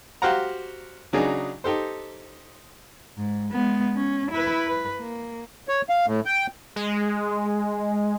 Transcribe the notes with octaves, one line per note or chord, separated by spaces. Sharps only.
F#4 G4 C5 F5 F#5 A#5
C#3 F#3 D4 D#4 G#4
D#4 G4 A4 C5
G#2
G#3 B3
C#4
E4 B4
B4
A#3
C#5
F5
A2
G5
G#3